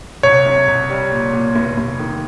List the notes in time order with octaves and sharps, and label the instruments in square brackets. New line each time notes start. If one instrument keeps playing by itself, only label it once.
[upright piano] C2 [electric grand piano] C#5
[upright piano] C3
C2
G3
A#2
A#2
F1
F1
D#3